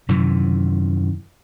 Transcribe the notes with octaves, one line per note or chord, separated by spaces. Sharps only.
F#2 C3 D#3 E3